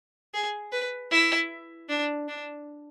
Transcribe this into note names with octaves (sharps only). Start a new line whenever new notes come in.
G#4
B4
E4
D4
D4